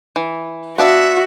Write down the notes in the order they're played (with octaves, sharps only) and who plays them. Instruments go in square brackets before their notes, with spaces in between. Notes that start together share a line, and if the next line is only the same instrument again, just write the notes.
[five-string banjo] E3
[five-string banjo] B3 D4 F5 [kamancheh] F#4 [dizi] E5